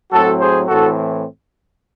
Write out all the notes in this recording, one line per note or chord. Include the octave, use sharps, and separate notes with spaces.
A2 F#3 C4 F#4 A4
G#4 C5
A2 E3 C4 F#4 A4